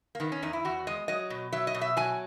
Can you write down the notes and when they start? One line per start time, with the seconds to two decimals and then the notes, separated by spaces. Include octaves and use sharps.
0.15 A#3
0.20 D#3 B3
0.32 C#4
0.42 E2 D#4
0.53 E4
0.65 E2 F#4
0.87 G#3 D#5
1.08 F#3 D#5
1.30 B2
1.52 F#3 E5
1.67 D#5
1.75 B2
1.81 E5
1.97 F#3 G#5